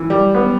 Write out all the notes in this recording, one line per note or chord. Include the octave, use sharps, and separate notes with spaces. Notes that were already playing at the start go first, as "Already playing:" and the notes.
Already playing: E3
G3
B3